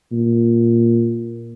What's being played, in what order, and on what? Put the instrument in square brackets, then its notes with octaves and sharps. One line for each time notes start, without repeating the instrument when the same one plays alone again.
[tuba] A#2